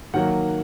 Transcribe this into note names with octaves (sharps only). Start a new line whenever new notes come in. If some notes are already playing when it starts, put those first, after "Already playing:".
D#3 F#3 A#3 F#5